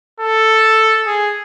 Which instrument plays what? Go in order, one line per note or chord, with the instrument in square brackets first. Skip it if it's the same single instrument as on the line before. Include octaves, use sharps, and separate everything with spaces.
[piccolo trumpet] A4
G#4